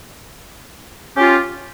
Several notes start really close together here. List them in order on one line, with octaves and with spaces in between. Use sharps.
C#4 G4 F4